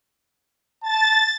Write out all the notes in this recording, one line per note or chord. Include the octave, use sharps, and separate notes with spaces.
A5 A6